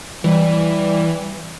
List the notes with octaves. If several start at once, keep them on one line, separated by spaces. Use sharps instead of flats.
E3 G3